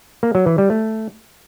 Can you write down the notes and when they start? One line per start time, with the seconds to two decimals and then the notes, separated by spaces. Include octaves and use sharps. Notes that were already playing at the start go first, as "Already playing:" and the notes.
0.23 A#3
0.35 F#3
0.46 E3
0.58 G3
0.70 A3